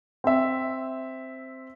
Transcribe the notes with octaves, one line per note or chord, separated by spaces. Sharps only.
C4 E5